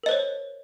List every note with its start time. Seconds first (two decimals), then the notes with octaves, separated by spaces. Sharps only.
0.03 A#4
0.06 D#5
0.09 C5
0.11 C#5